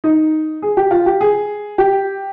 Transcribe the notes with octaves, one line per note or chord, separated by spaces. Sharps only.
D#4
G#4
G4
F4
G4
G#4
G4